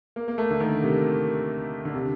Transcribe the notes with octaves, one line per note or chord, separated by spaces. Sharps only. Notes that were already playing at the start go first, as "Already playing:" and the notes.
A#3
A#3
A3
D3
D#3
C3
D3
C3